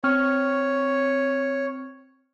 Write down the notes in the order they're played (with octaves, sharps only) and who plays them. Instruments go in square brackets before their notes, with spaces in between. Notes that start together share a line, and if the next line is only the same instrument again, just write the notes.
[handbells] C4 C#6 F6 [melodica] C#5